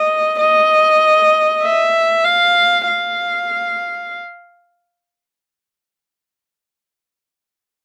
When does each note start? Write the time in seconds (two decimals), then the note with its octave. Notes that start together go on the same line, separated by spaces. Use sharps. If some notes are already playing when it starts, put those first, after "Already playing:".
Already playing: D#5
0.40 D#5
1.63 E5
2.25 F5
2.87 F5